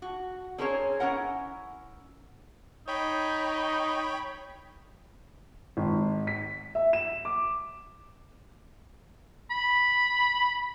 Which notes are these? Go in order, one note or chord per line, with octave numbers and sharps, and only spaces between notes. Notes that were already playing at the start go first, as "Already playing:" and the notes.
F#4
C4 C#4 G#4 A#4 C5 C#5
C#4 E4 A#4 F#5 A#5
D#4 C#5 G5 B5
G#1
B6
E5
E7
D6
B5